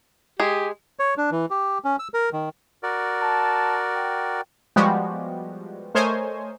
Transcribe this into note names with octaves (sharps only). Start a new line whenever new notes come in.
G#3 G4 G#4
C#5
D4
E3
G4
C#4
E6
A#4
D#3
F#4 A#4 D5
A5
G5
F3 G3 G#3 B3 F#4 G4
A3 A#4 C5 C#5 D#5 G#5